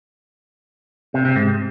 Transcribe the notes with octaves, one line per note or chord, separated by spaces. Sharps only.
C3
C3
G#2